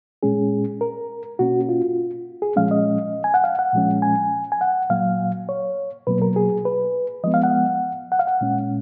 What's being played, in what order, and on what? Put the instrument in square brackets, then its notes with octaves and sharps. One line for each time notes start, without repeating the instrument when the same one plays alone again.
[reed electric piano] A#2 G#3 C#4 G#4
A#4
B2 A#3 C#4 F#4
F4
G#4
A#2 F3 G#3 C#4 F5
D#5
G#5
F#5
F5
F#5
A#2 F3 G#3 C#4
G#5
G#5
F#5
A#2 F#3 A#3 F5
C#5
B2 F#3 A#3 B4
A#4
G#4
B4
F3 G#3 B3 D#5
F5
F#5
F#5
F5
F#5
A#2 G#3 C#4